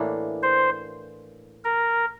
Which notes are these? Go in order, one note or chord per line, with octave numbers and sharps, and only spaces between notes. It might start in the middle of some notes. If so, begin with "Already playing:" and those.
Already playing: A2 E3 A#3 D4
C5
A#4